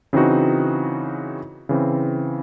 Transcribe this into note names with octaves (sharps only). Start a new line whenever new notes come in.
C#3 E3 C4 D#4 F#4
C#3 E3 C4